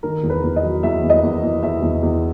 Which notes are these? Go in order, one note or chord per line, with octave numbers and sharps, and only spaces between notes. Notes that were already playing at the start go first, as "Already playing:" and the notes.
D#3 A#4
E2
B4
E2
D#5
F#3
E2 E5
E2
D#5
E2
E2
E2 E5
E2
E2